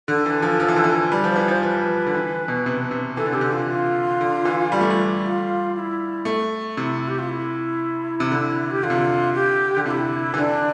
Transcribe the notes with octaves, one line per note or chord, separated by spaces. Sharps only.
D3 A4
E3
F3
F3
E3
D3
E3
G3 B4
F3 C5
E3 B4
F3 C5
F3 B4
D3
E3
B2
C3
C3
E3 A4
D3
C3 G4
D3
F4
F4
D3
E3
G3
A3
G3
F4
E4
A3
C3 E4
G4
F4
E4
C3
D3
G4
D3 F4
C3
D3
G4
D3
C3 E4 F4
E3
D3 D4